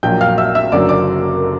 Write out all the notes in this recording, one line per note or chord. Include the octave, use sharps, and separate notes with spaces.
A#1 A#2 F#3 G5 G6
F5 F6
E5 E6
E5 E6
F#1 F#2 D3 F#3 A#3 D5 D6
D5 D6